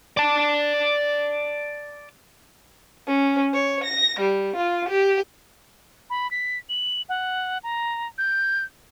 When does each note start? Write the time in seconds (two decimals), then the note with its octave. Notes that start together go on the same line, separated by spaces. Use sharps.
0.17 D5 A5
3.06 C#4
3.53 C#5
3.83 A#6
4.21 G3
4.57 F4
4.88 G4
6.10 B5
6.31 B6
6.69 F#7
7.09 F#5
7.63 A#5
8.18 G6